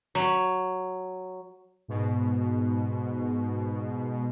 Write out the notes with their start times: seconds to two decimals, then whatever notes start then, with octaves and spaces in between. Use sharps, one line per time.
0.15 F#3
1.88 G#2 B2